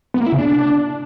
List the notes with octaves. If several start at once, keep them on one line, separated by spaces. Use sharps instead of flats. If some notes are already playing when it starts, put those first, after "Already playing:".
B3
A#3
E4
C#3
D4